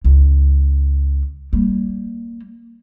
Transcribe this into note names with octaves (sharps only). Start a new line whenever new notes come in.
C#2
G3 A#3